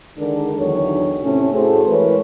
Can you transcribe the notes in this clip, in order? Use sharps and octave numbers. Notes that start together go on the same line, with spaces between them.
D3 D#3 G#3 D4 A#4
E2 D3 D#3 F#3 C#5
A2 C3 C#4
A2 F#4 G#4 A4 C5
E3 G#3 A#4 B4 C#5